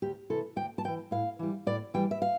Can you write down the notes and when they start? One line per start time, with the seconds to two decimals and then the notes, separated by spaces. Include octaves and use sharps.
0.02 D2 G4
0.30 C3 E3 A4
0.56 D2 G5
0.78 A5
0.84 C3 E3 G5
1.11 A2 F5
1.39 E3 G3
1.66 A2 D5
1.94 E3 G3 G5
2.11 E5
2.22 F5